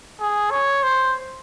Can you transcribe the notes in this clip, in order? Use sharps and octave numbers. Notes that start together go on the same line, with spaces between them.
G#4
C#5
C5